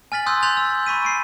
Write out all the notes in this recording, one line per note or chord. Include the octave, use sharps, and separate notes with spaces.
G#5 F6 A6 B6 F#7
G#5 C6 D#6 E6 F#6 G6
C6 F#6 G6 A6 F7 F#7
E6
B5 C#6 B6 D#7
C7 D7